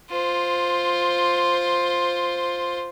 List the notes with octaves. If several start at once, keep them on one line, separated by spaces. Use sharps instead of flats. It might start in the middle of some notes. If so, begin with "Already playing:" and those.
F4 C5